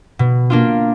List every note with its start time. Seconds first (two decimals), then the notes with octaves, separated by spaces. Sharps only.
0.19 B2
0.50 A#3 D4 F4